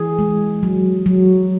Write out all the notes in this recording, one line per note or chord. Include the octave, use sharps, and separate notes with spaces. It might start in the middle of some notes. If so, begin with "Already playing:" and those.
Already playing: E3 G#4
G#3
F#3
F#3